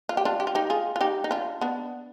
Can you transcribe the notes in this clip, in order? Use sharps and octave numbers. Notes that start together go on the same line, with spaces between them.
F4
G4
D4 F4
G4
F4
D#4 G4
F4 G#4
F4
D#4 G4
D#4
D4 F4
B3 D4